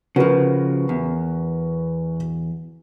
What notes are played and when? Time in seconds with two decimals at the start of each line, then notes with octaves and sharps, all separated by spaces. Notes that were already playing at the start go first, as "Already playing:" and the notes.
0.16 C#3 F3 F#4 A#4 B4
0.89 E2